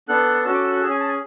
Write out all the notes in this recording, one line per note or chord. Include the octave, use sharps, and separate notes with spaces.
B3 D4 A4 F#6
C#4 F#4 A4 E6
D6
E6
F#6
C#4 G#4 E6
G#5
A5
G#5